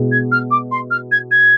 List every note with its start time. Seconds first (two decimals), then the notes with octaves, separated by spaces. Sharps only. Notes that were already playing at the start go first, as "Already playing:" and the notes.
Already playing: B2 G#3 B3 E4 G#4
0.11 G#6
0.31 F6
0.51 D6
0.71 C6
0.90 F6
1.11 G#6
1.31 G#6